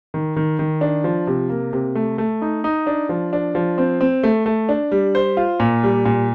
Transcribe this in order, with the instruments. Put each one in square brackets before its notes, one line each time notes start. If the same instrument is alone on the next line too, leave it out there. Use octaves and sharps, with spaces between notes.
[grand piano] D#3
D#3
D#3
D4
F3
C3
A#3
C3
A3
A3
D#4
D#4
D4
F3
D4
F3
C4
C4
A3
A3
D4
G3
C5
F4
A#2
G3
A#2